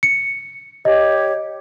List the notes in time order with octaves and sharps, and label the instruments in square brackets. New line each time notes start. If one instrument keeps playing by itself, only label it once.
[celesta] C#7
[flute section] G4 C#5 [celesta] D#5